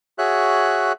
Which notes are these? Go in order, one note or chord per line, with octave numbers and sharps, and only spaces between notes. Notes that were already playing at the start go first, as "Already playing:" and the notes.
F#4 G#4 C#5 E5 F#6